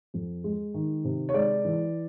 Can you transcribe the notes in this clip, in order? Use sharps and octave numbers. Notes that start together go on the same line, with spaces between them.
F2
G#3
D#3
C3
C#5
G#3 D5
E3